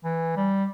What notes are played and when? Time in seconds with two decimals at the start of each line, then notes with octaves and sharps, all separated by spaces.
0.04 E3
0.36 G3